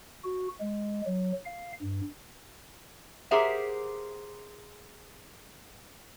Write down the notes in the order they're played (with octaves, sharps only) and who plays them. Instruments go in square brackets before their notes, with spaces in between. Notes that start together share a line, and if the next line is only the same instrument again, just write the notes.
[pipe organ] F#4
G#3
F#3
F5
G2
[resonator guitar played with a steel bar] G4 G#4 A#4 C5 E5 F#5